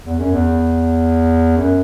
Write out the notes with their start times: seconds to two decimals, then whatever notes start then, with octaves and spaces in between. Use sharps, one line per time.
0.05 E2
0.19 F#2
0.32 E2
1.57 F#2